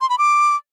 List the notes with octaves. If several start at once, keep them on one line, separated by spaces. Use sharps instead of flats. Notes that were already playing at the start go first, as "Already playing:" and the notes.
C6
B5
D6